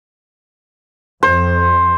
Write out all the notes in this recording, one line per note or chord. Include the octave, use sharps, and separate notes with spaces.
F2 C5